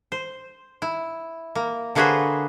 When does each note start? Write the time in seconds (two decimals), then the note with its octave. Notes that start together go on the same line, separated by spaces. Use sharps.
0.12 C5
0.82 E4
1.55 A#3
1.95 D3 A#3 F#4 G#4 B4 C5